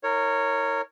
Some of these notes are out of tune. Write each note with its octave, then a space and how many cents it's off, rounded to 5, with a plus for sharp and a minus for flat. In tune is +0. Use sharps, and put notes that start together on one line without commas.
D#4 +45 A#4 -20 C#5 +0